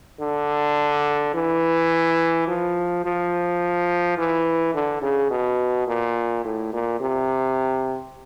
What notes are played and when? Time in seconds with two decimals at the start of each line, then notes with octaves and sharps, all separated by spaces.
0.21 D3
1.34 E3
2.48 F3
3.04 F3
4.18 E3
4.74 D3
5.02 C#3
5.30 B2
5.87 A#2
6.45 A2
6.73 A#2
7.00 C3